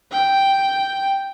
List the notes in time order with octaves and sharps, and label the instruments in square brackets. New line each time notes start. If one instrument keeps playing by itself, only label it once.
[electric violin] G5